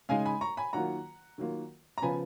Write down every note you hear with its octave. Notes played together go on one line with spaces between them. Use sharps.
C#3 G#3 D#4 F5 G#5
G#5 B5
A#5 C#6
G#5 B5
D#3 F#3 A#3 F4 F#5 A#5
D#3 F#3 A#3 F4
A#5
C#3 F3 B3 G#5 B5